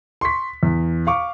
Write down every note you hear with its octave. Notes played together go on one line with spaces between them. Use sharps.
C6 C#6 B6
E2
F5 C#6 D6